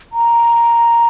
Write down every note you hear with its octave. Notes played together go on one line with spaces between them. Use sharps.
A#5